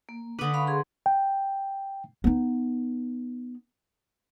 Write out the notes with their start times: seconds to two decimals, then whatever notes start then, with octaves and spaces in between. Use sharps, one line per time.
0.09 A#3
0.39 D3 D4 B4 D#6
0.54 F5 B5 C#6
0.67 G#4 C6
1.06 G5
2.24 B3 D#4